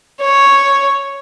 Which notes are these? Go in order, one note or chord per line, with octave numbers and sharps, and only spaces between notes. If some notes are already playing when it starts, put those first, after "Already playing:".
C#5